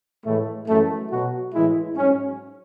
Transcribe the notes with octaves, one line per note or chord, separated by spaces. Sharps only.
A2 E3 G#3 A3
F#2 E3 G#3 A3
B2 F#3 F#4
A2 E3 G#3 E4
G#2 F#3 C#4